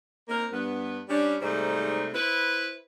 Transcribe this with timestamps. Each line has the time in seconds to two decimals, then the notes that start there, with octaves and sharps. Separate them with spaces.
0.28 A#3 C4 D#4 A#4
0.52 G2 B3 B4
1.09 G3 C#4 D4
1.41 G#2 C3 G3 A3 D#4 C5
2.14 E4 B4 C5